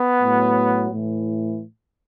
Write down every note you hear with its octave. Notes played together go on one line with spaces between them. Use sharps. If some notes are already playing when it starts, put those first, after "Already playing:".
Already playing: B3
A2 F#3
A2 E3